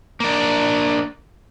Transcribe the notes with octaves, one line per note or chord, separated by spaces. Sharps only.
A#3 D4